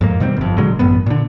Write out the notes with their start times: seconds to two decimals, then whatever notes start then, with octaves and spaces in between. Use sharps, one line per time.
0.01 F2 G#2 A#3
0.20 B2 D#3 G3 C4
0.37 G1 F2
0.58 A#2 D3 F#3 G#3
0.79 A1 F#2 B3
1.06 A#2 D3